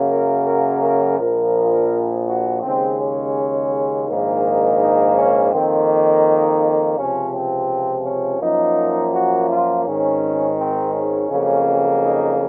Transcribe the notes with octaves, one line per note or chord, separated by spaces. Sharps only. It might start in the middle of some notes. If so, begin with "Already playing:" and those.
Already playing: F#2 C#3 F#3 A#3
A#4
A#4
A#4
A#1 A#2 F3 A#4
F#4
D#2 C#3 G#3 C4
C#4
A#1 G#2 D#3 A#3
D#4
D#4
C#4
F2 D#3 A#3 C4
D#4
C#2 C3 F3 C#4
C4
C#4
F#2 F3 A#3 D#4
F#4
F4
G#1 G#2 D#3 C#4
C4
C#4
F2 C#3 F#3 A#3
D#4